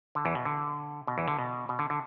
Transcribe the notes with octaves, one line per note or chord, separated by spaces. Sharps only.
D3
E2 E3
B2
D3
B2
E2 E3
D3
B2
B2
D3
D3